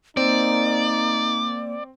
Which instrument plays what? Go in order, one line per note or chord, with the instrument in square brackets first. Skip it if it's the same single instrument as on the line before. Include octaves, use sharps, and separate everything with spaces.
[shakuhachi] A#3 [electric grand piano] C4 [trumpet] D#4 [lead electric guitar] D5